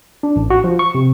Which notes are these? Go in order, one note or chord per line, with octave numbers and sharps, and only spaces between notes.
D4
A1
F#4
F3
C#6
C3